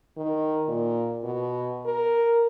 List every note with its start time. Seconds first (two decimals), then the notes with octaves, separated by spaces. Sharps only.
0.17 D#3
0.68 A#2
1.24 B2
1.85 A#4